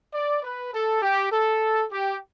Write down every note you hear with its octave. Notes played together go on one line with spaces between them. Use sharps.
D5
B4
A4
G4
A4
G4